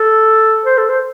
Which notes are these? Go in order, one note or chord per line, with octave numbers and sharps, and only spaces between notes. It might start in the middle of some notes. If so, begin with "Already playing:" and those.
Already playing: A4
C5
A4
C5